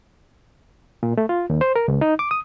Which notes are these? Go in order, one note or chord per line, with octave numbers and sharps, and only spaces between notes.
A#2
A3
F4
D#2
C5
A#4
C#2
D#4
D6
D#6